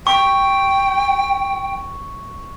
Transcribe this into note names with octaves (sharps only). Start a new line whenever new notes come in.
G5 C#6